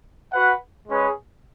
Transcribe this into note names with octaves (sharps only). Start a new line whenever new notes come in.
F#4 B4 F#5
G#3 C#4 G#4 B4